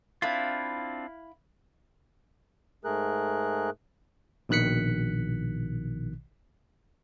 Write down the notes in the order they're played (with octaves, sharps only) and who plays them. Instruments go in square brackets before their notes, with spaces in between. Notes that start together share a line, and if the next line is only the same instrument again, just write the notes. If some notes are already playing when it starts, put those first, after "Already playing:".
[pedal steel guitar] C4 D4 F4 [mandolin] E4 F5 B5
[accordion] G#2 A3 G#4 A#4 F#6
[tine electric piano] A#1 B2 D#3 F#6 B6 C#7